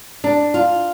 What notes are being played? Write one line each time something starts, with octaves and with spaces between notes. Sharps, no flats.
D4
F4